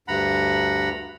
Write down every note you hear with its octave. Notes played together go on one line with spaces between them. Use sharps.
D2 G2 F#5 A#5 B5